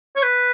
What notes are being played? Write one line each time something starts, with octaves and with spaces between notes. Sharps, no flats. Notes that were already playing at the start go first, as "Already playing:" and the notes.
C#5
B4